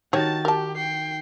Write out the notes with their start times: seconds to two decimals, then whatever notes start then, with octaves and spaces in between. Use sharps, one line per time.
0.13 D#3 F#4 G4 C#5 A5 A6
0.45 G4 A#4 A5
0.75 G5 C7